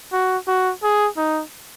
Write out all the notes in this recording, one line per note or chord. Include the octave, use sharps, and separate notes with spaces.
F#4
F#4
G#4
D#4